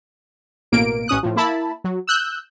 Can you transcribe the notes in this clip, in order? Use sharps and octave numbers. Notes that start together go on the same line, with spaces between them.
A1 B2 A#3 D7
A1 C#4 D#6 F#6
A2 F3
A#3 E4 A5 B5
F#3
E6 F#6 G6